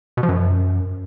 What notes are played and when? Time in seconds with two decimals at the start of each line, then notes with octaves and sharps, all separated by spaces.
0.17 B2
0.23 F3
0.29 F#2